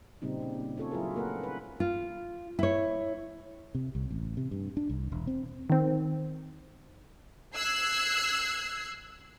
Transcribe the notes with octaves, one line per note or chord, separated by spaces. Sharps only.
A#2 C#3 G3 C4 D#4
A#2
C#4 F4 A4 C#5
F#3 E4 F4 G#4 A#4
A3 A#3 A#4 B4 F#5
B4
F4
E4 C#5
C3
C2
A1
C3
G2
D4
C2
E1
C4
D#3 C4
E6 F#6 G#6 C7